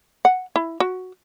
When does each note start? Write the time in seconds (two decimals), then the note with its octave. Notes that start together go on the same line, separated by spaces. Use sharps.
0.25 F#5
0.56 E4
0.80 F#4